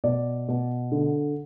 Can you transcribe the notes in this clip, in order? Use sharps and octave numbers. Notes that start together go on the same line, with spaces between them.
B2 D5
B2
D3